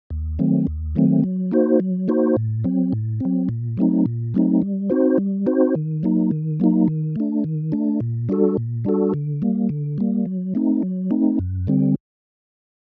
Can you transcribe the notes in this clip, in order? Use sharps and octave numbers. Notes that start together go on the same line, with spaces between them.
D#2
D#3 F#3 A3 C4
D#2
D#3 F#3 A3 C4
F#3
A#3 D#4 F#4 C5
F#3
A#3 D#4 F#4 C5
A2
F#3 C4
A2
F#3 C4
A#2
F#3 A3 C4 D#4
A#2
F#3 A3 C4 D#4
G3
C4 D#4 F#4 C5
G3
C4 D#4 F#4 C5
D#3
F#3 A#3 D#4
D#3
F#3 A#3 D#4
D#3
A3 D4
D#3
A3 D4
A#2
G3 D4 F#4 A4
A#2
G3 D4 F#4 A4
D3
G3 A#3
D3
G3 A#3
F#3
A3 C4 D#4
F#3
A3 C4 D#4
F#2
D3 G3 C4